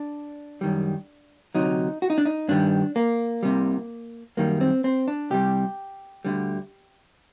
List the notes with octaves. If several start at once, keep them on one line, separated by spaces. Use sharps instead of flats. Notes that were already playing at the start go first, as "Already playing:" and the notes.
Already playing: D4
F#2 D#3 G3
D2 C3 F#3 D#4
F#4
D#4
D4
D#4
G2 D#3 G3 D4
A#3
C2 C3 G3
F#2 D#3 G3 A#3
C4
C4
D4
C2 C3 G3 G4
D2 D3 G3